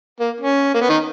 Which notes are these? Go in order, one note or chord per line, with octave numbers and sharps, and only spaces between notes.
A#3
C#4
A#3
B3
D#3 D#4